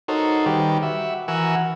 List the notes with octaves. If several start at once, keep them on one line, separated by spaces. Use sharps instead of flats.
D#4 F#4 A4 A#4 C5 C#5
D#3 G3 G4 B4
F#4 E5
E3 F#4 A#4 F#5 G#5 E6